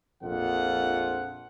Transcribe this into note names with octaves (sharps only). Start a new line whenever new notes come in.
A#1 F2 F3 F4 F#5